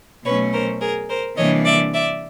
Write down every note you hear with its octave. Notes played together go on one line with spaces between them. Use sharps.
B2 F#3 A3 C#4 B4 C#5
A#4 C5
G#4 A#4
A#4 C5
C3 E3 G3 A#3 D4 C#5 D#5
D5 E5
D5 E5